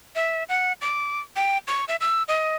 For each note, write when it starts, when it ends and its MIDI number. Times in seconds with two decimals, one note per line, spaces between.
0.15 0.44 76
0.49 0.73 78
0.82 1.20 86
1.36 1.58 79
1.68 1.85 85
1.88 1.96 76
2.01 2.23 88
2.28 2.57 75